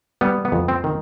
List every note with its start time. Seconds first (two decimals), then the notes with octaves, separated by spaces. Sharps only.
0.21 G3 B3
0.45 B3
0.52 F2
0.68 C4
0.84 D#3